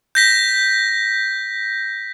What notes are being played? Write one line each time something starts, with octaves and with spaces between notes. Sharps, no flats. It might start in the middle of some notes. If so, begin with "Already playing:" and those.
G6 A#6 B6